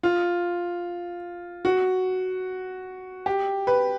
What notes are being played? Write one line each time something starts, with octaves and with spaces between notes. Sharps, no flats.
F4
F#4
G4
B4